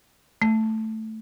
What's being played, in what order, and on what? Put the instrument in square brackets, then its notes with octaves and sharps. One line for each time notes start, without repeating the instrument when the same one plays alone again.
[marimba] A3